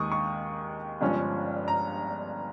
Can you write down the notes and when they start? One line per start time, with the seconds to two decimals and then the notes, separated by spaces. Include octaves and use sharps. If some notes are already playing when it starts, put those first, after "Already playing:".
Already playing: D#2 D#3 G#3 C#6 D#6
0.12 C#6
1.01 G1 G2 F3 G#3 C#4
1.68 A#5